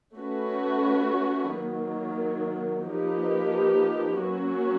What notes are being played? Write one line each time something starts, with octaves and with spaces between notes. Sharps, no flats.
A3 C#4 F#4 B4
D#3 F#3 A#3
F3 A#3 D#4 G4 B4
F#3 A#3 C#4 F#4